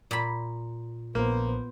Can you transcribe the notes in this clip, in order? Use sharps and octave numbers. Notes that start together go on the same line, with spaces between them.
A#2 B5
A#1 A#3 B3 C5